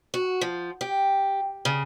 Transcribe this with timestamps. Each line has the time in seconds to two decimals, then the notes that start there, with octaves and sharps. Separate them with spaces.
0.14 F#4
0.41 F3
0.81 G4
1.65 C#3